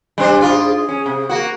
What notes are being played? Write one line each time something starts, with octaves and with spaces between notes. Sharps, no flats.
G3 D4 C5
G#2 F4 G#4 D5
G#4
C#4
C3
A#3 F#4